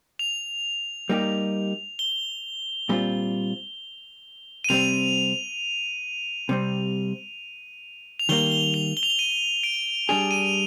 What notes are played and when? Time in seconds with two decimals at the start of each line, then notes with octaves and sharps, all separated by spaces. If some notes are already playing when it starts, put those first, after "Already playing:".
0.19 F7
1.09 G3 A#3 D#4 G4
1.99 G7
2.89 A#2 G3 C4 F4
4.64 D#7
4.69 C3 G3 C4 F7
6.49 C3 G3 C4
8.19 F7
8.29 D#3 G3 A#3 G7
8.52 G7
8.74 F7
8.97 G7
9.03 F7
9.10 G7
9.19 D#7
9.64 D7
10.08 G3 D4 G#4 F7
10.31 D#7